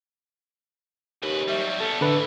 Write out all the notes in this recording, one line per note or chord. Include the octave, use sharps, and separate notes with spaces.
D#2 C#3 B4
F#3 G3 E5
G3 B3 A4
A2 D3 E3 B4